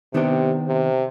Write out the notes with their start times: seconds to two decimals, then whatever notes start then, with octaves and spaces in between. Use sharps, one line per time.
0.14 C3 D#3 B3 D4 G4
0.68 C3